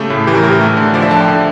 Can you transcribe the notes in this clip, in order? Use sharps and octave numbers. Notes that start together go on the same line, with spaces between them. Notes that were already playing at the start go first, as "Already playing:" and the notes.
Already playing: C#3 A3 G4
A2
E3 G4
A#4
A2 G4
A#4
A3
D3
F3 D5
E5
D3 A5
G5
D3